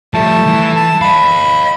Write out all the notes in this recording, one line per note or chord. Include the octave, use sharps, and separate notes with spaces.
F3 G3 A3 A5
E3
A5
D#5 F5 B5